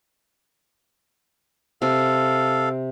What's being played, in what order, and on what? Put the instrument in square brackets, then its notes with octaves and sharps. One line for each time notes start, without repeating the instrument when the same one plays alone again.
[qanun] C3 [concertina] A4 F5